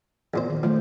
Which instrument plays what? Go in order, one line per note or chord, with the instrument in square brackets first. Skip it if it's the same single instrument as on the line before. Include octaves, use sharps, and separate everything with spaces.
[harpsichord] E2 A#2 C5
[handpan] D#3
[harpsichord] F3 [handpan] A3 C5